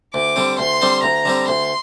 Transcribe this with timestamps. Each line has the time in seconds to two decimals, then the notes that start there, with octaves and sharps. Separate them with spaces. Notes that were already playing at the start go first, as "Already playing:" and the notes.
0.14 D2 D6
0.36 D3 G3 C4
0.59 D2 C6
0.82 D3 G3 C4
1.03 D2 A#5
1.25 D3 G3 C4
1.48 D2 C6